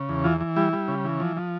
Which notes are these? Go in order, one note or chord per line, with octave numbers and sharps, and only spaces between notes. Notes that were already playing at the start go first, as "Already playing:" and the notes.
Already playing: C#3
E2
E3 F4
E3
G3 E4
G3
C#3
E3
F3
F3